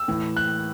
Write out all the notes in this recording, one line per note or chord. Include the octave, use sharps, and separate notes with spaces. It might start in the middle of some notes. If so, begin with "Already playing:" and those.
Already playing: E6
A2 E3
F#6